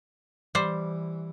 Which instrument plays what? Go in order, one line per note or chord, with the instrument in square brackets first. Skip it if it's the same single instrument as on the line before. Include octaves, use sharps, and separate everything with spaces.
[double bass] E3 [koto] G3 C5